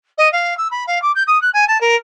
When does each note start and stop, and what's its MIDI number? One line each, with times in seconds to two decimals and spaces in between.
0.18 0.31 75
0.32 0.56 77
0.57 0.68 88
0.71 0.84 83
0.87 1.01 77
1.02 1.12 86
1.15 1.23 91
1.27 1.41 87
1.42 1.50 90
1.53 1.67 80
1.68 1.80 81
1.81 1.95 70